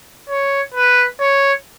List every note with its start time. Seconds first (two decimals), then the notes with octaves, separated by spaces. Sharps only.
0.30 C#5
0.74 B4
1.20 C#5